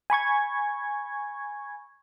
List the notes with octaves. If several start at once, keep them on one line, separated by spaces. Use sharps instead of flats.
G#5 B5 C#6 G#6